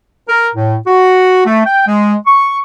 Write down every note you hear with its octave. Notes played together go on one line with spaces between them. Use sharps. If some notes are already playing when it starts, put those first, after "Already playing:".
A#4
A2
F#4
A3
G5
G#3
C#6